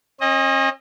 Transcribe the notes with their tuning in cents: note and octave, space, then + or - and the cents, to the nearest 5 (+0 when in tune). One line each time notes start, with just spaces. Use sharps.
C#4 -45 D#5 +0